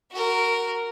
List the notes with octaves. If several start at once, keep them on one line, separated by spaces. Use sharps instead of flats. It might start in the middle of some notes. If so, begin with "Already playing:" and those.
F#4 A#4